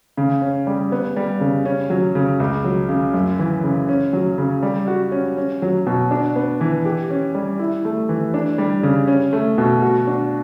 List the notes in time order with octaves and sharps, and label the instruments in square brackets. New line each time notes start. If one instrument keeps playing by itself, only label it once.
[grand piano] C#3
C#4
G3
B3
G3
C#3
C#4
F#3
C#3
C#2
F#3
C#3
F#2
E3
C#3
C#4
F#3
C#3
G3
F#4
C#4
C#4
F#3
B2
D4
B3
E3
G4
C#4
G3
E4
A3
E3
D4
G3
C#3
C#4
A3
B2
F#4
D4